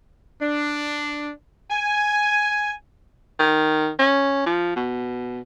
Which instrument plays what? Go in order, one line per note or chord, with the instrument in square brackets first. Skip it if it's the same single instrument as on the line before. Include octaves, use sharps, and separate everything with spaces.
[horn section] D4
G#5
[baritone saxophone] D#3
C#4
F3
B2